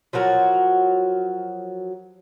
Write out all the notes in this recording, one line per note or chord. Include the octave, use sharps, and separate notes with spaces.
F3 F#3 F#4 A#4